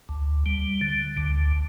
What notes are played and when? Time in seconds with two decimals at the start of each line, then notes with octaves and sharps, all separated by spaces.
0.09 D2
0.46 G3
0.81 D3
1.17 D2